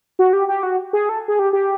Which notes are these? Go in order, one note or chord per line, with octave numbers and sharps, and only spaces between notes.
F#4
G4
G4
F#4
G#4
A4
G#4
G4
G4